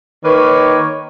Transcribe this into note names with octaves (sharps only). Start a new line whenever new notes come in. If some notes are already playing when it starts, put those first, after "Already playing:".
D#3 A#3 B4 C#5